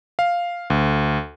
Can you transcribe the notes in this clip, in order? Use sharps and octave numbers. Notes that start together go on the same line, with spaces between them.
F5
D2